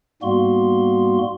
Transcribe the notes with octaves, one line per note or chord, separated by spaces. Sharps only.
G#2 G3 A#3 B3 F#4 C6